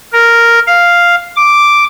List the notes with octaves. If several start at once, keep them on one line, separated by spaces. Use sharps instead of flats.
A#4
F5
D6